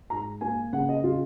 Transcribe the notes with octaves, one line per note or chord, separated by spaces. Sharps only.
G#2 A#5
A#3 G#5
C#3 F#5
D#5
C#3 F4